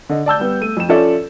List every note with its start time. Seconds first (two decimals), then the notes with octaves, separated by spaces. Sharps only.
0.09 D3 D#5
0.26 D5 A5 E6 G6
0.39 G3 B3
0.61 A3 D#7
0.77 F2 E7
0.89 F3 C#4 F4 A4 D5 E5